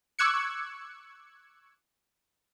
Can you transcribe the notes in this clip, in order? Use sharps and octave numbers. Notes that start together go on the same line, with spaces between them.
C#6 D6 E6 F#6 G#6 C#7